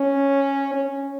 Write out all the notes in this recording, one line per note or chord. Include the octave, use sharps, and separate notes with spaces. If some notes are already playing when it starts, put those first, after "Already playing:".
Already playing: C#4
C#4